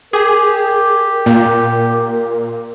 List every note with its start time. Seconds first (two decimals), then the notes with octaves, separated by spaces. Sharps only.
0.13 G4 G#4 A#4
1.26 A#2